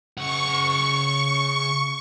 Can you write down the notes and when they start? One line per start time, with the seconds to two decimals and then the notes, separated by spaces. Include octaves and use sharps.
0.17 C#3 F#5 C#6